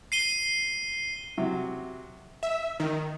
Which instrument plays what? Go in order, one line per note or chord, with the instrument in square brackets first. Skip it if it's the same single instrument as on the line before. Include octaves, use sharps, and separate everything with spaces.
[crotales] C7 D#7 G7
[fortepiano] C3 F#3
[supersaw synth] E5
D#3